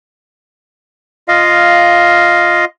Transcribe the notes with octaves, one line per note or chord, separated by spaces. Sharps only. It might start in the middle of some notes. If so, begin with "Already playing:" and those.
F4 D#5 F5